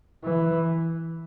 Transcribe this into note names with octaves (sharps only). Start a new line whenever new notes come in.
E3